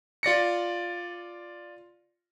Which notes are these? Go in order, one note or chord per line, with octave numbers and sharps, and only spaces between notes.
F4 D5 A#6 C#7